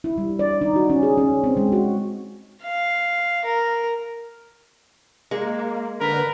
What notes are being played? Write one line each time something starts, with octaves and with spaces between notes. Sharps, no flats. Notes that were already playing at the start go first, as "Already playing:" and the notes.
E4
G3
D5
D#4
F#4
C#4
G#4
C#4
C4
G#3
F#4
F5
A#4
G#3 A#3
D3 A#4 B4